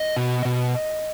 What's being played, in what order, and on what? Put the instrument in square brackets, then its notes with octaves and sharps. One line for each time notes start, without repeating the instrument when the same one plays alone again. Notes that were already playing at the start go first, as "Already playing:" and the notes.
Already playing: [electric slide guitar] D#5
B2
B2